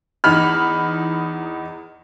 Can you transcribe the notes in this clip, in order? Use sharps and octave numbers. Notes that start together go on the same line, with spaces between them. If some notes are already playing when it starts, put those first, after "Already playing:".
E2 D#4 B5 F6